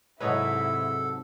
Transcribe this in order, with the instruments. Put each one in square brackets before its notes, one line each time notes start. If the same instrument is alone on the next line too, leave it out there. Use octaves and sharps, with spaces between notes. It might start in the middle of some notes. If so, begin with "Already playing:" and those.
[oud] G#2 C3 F#3 [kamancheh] E4 [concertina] A4 [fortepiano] B4 C#5 D#5